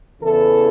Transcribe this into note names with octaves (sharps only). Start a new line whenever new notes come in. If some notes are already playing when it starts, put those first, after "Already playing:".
E2 C#3 E3 A4